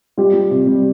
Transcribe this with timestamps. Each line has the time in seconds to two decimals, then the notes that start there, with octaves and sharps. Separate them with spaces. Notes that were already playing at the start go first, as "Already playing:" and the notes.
0.17 G3 F4 G4
0.34 G3
0.51 C3
0.67 G3